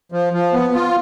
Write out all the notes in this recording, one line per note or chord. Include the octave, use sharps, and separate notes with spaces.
F3
F3
B3
F4